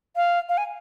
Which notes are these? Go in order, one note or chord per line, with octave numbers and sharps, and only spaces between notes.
F5
F5
G#5